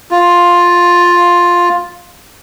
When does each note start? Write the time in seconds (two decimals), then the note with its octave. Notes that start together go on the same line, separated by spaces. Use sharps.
0.11 F4